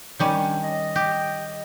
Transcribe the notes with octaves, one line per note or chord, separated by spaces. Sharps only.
D#3 G3 C#4
D4
D#5
G4